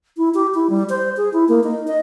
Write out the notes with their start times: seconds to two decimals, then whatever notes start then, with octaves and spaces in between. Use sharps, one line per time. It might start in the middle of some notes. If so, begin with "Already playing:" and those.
0.17 E4
0.34 G4
0.54 E4
0.70 G3
0.89 C5
1.17 G#4
1.33 E4
1.48 A#3
1.64 D#4
1.87 D#5